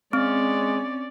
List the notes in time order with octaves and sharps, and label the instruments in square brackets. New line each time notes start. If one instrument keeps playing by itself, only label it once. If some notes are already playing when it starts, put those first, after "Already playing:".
[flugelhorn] G#3 [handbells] C4 [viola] C#4 D5